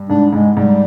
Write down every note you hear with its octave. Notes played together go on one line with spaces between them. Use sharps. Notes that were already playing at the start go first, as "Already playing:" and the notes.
Already playing: G2
G#2 D4
G#2 G#3
G#2 G3